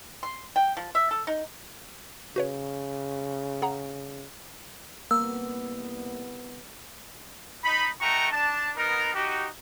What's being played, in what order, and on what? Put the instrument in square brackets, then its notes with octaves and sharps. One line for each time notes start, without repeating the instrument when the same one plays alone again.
[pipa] C6
G5
F3
E5
A4
D#4
[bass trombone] C#3 [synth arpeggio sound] F#4 B4 C#5
[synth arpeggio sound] G#4 F#5 A#5
[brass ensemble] C2 B3 [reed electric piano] A#3 [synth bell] E6
[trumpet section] D#4 B5
A3 D#4 F#4 G5 A#5 C#6
D4 A5
B3 D#4 A#4
D#4 F#4 G4